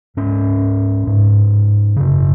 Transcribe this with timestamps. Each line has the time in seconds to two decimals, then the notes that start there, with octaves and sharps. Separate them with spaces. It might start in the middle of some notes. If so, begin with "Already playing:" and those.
0.17 G#2 C#4
1.07 G#2
1.96 F#2 C#3